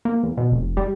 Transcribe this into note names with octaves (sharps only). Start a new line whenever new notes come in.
A#3
E2
B2
F1
G3